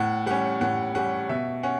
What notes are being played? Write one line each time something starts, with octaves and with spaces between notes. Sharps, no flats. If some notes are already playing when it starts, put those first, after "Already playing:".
Already playing: A2 F#5
G3 C#4 F#5
A2 F#5
G3 C#4 F#5
B2 E5
C#4 F#5